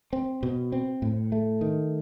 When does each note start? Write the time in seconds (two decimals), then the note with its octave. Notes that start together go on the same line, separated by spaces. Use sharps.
0.13 C4
0.43 B2
0.72 C4
1.02 A2
1.32 A3
1.61 D#3